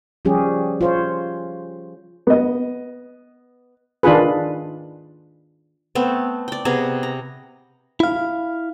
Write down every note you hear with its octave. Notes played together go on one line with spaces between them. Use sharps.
F3 G3 C#4 G4 G#4
F4 C5 C#5
B3 D#5
D#3 D4 F4 G#4 B4
A3 B3 C4
D5 G5
C3 B3 G#4 A#5
A#5
E4 F5